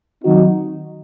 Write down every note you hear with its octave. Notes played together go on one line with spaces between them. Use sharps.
D#3 F#3 C4 D#4 F#4